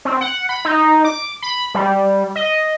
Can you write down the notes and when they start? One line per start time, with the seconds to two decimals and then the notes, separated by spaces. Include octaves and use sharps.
0.05 C4
0.21 F#5
0.49 B5
0.65 D#4
1.05 D6
1.42 B5
1.75 G3
2.36 D#5